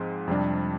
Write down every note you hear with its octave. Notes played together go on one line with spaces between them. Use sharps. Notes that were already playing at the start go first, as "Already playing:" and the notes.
Already playing: G#2 F3 G#3 C4
F2 C3 G3 D4